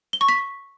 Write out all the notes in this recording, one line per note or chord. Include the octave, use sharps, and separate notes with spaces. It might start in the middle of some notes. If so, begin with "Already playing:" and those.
G7
C#6
B6